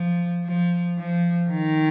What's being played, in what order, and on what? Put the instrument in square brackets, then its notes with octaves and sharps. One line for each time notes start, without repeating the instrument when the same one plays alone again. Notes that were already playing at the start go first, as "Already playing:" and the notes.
Already playing: [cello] F3
F3
F3
D#3